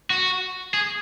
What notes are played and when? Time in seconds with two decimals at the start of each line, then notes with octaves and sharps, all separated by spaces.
0.10 F#4
0.74 G#4